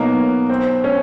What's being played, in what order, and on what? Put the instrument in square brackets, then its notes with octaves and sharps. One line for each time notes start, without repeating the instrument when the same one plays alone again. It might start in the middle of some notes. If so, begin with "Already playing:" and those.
Already playing: [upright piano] B2 F#3 B3 D#4 [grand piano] A#3
[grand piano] C4
C#4